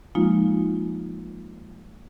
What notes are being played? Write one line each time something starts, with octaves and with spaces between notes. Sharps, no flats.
F3 G#3 A#3 D#4 F4